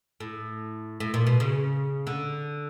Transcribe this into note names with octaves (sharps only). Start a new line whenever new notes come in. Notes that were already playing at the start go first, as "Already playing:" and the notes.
A2
A2
A#2
B2
C#3
D3